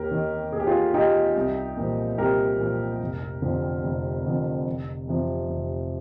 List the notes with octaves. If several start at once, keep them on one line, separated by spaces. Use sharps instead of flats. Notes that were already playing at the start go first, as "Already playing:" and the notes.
Already playing: D#2 G4 A#4
D#3
D#2 G#4
G4
F4 G#4
D#3 D#4 G4
C2
A#2 F3
C2 G4 A#4
A#2 F3
F1
F2 D3 F3
F1
F2 D3 F3
F1
F2 C3 F3
F1